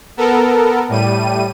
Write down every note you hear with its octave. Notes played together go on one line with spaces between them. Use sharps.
B3 A4 A#4
A2 G3 D#7